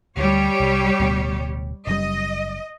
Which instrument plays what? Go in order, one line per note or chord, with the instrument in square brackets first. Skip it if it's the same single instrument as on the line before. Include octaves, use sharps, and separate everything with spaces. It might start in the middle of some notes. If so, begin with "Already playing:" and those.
[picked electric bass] D2 [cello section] G3 G4 C#5
[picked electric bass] C2
D1 D2 B2
[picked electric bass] F#1 F#2 G3 [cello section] D#5